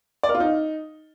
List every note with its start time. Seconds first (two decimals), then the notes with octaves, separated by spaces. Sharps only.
0.23 D5
0.29 A#4
0.35 F4
0.40 D#4